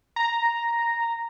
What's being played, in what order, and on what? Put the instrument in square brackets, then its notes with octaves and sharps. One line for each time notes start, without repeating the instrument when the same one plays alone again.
[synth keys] A#5